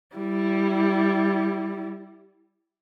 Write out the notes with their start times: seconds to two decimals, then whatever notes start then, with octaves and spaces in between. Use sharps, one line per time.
0.16 G3 E4